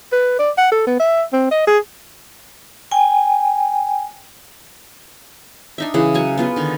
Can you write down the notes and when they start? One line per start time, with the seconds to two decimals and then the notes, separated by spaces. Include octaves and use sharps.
0.13 B4
0.39 D5
0.58 F#5
0.72 A4
0.87 B3
1.00 E5
1.33 C4
1.51 D#5
1.68 G#4
2.91 G5 G#5
5.78 D4 D#4 E5
5.94 C#3 E3 G#4 F#5
6.14 F#3 F#5 G#5
6.38 B3 F4 B4
6.56 D3 D#3